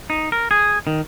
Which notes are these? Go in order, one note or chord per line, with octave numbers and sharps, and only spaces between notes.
D#4
A#4
G#4
D#3